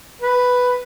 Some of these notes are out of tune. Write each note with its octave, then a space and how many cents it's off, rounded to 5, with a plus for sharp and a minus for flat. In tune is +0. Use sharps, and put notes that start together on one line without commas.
B4 +5